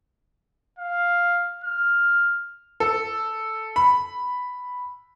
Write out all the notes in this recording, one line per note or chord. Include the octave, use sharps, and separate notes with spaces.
F5
F6
A4
B5